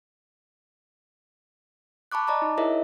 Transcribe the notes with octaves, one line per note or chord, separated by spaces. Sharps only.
A5 B5 C#6 D6 F#6
D5 D#5 A5 A#5 D6
D#4
E4 G#4 A#4 C#5 D#5 E5